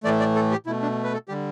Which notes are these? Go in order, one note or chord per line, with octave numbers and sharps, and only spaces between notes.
A2 E3 A3 D5
D5
A4
G4
B2 A3 E4
D4
B4
A4
D3 G3 G4